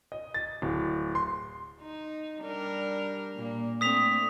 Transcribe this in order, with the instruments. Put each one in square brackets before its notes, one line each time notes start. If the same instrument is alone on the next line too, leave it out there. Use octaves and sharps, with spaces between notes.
[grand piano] D#5
A6
D1
C6
[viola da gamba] D#4
G3 D4 A#4
A#2 A#3
[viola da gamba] A3 C4 D4 [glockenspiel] D#6 B6 F7